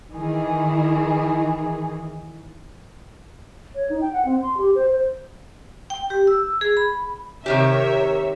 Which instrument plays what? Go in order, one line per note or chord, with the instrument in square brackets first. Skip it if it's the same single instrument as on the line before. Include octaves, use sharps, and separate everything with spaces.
[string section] D#3 E3 G#4
[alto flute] C#5
D#4
G5
F#5
C4
C6
G4
C5
C5
[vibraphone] G5
G4
E6
G#4
B5
[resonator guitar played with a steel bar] C3 D#3 G4 [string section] A#4 C#5 E5